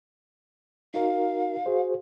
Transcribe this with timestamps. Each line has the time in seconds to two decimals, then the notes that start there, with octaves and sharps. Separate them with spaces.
0.94 D#4 F#4 A#4 F5
1.66 F#4 G#4 C5